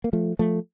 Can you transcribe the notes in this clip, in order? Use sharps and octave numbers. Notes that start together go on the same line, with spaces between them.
A#3
F3 A3
F3 A3